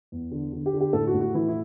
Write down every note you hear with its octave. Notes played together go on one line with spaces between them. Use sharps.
E2
D3
D3
G4
D3
G4
A2 A4
F#4
A2
F#4
E3 E4
E4